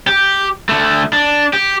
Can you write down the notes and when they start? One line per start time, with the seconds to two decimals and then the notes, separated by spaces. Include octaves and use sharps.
0.07 G4
0.69 D3 A3
1.13 D4
1.53 G4